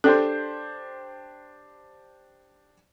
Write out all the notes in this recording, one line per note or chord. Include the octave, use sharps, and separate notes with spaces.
D4 G4 A4 C5